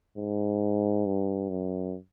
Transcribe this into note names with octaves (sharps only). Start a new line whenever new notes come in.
G#2
G2
F#2